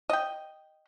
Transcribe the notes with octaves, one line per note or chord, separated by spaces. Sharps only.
D#5 G5